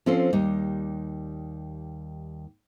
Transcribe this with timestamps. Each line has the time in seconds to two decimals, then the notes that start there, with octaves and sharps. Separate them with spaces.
0.06 F3 C4 C#4 F4 A4 C5
0.33 D#2 G3 D#4